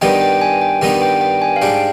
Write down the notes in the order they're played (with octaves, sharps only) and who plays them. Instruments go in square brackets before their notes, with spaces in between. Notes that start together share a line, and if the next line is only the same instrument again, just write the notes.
[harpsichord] G2 D#3 G3 B3 D#4 [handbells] G5
[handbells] G5
G#5
G5
[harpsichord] G2 D#3 G3 B3 D#4
[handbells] G5
G5
G#5
F5
[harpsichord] G#2 G3 D4 [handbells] G5